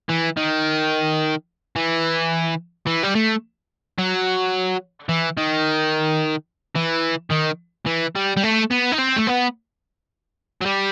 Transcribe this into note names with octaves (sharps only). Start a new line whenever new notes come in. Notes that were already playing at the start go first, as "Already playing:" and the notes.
E3
D#3
E3
E3
G3
A3
F#3
E3
D#3
E3
D#3
E3
G3
G3
A3
B3
D#4
C4
A3
B3
F#3
G3